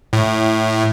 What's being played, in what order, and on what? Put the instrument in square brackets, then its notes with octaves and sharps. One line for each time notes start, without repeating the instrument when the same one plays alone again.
[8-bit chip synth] A2